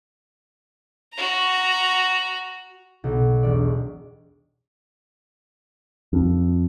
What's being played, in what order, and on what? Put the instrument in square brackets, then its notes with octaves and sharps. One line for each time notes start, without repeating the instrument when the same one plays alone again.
[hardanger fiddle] F#4 A#5
[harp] B1
E1 D5
[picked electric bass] F2